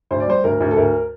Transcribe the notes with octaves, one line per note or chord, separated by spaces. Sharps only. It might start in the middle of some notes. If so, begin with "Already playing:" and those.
D2 C5
D5
G3 C5
D2 A#4
D2
A4
D2 A#4